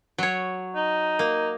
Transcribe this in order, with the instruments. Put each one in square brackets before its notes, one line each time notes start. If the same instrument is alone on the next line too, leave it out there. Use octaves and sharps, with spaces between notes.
[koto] F#3 C#5
[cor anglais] D#4
[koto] A#3